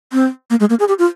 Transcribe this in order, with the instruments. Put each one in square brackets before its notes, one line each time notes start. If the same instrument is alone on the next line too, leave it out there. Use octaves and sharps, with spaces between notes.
[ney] C4
A#3
G#3
A#3
G#4
G4
F4